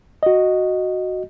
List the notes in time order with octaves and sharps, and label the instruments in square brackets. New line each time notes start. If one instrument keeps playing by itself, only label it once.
[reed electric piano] F#4 D#5